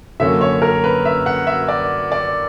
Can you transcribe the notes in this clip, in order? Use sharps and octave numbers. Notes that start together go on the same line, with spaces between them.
F#2 D3 A#3 C#4 E5
C#5
A#4
B4
E5
F#5
E5
D5
D5